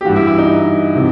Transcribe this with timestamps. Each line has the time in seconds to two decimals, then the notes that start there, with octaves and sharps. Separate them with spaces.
0.01 G4
0.05 E3 F#4
0.09 G2
0.16 E4
0.27 E4
0.38 D#4
0.95 C3 E3